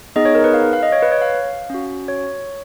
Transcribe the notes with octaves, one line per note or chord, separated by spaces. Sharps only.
B3 D#4 G#4 D#5
C#5
A#4
B4
F5
F5
D#5
C#5
B4
C#5
F5
C#4 F#4
C#5